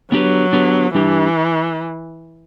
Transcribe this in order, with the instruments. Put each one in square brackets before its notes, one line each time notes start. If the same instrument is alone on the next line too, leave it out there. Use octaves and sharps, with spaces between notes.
[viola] F#3 [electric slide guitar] B3 D4 G4 B4
[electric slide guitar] B3 D4 G4 B4
[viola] E3 [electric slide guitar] G3 D4 G4